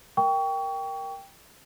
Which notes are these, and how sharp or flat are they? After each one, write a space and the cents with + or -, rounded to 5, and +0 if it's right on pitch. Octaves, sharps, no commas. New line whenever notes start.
A#4 +0 G5 +0 C#6 +30